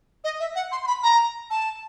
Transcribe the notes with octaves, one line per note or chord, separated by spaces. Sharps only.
D#5
E5
F#5
C6
C6
B5
A#5
A5